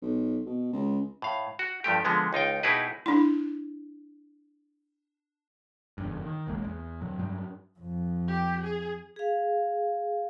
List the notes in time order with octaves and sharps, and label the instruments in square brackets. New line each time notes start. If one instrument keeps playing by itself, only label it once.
[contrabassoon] B1
B2
C#2
[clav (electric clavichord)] A2 F5
F#4
G2 F3 A3 G4
D3 F3 G#3 B3
C#2 D#4 F4 G5
B2 D#4 E4 G4 G#4 B4
[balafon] D4 E4
[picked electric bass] F#1 E2 G2
D#3
E1 A1 G#3 A#3
E2
A2 F#3
G2 F#3 G3
[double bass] F2
[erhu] G4
G#4
[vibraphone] G#4 F5